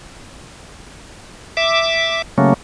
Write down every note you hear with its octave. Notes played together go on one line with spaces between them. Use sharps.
E5 D6
C#3 F#3 A3 A#3 C#4